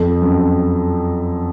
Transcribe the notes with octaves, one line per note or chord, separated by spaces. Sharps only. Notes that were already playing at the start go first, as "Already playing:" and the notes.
Already playing: F2
F#2